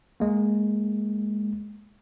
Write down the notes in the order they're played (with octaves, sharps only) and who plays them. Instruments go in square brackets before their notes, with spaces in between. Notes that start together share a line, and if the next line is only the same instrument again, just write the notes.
[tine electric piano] G#3 A#3